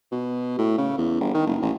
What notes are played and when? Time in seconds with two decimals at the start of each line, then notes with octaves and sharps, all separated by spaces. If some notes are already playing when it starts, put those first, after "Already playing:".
0.11 B2
0.59 A2
0.78 C#3
0.98 E2
1.20 G1
1.34 D#3
1.46 F#1
1.62 A1